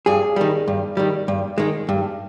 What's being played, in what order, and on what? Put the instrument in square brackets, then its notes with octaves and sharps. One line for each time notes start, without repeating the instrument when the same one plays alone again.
[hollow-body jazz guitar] G2 G#4
D#3 G3
G2
D#3 G3
G2
D#3 G#3
G2